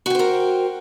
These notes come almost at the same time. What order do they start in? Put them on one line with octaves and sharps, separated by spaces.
F#4 G5 C5 A#4